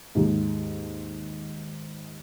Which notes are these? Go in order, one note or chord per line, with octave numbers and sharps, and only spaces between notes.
D#2 G#2